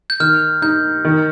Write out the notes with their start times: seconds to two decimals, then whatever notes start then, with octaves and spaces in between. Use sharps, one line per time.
0.10 G6
0.20 D#3 F6
0.62 D#4 G6
1.05 D#3